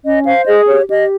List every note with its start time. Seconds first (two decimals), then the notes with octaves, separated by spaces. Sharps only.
0.04 C#4 D#5
0.25 C5 F5
0.46 G#4 D#5
0.68 G4 C#5
0.89 G4 D#5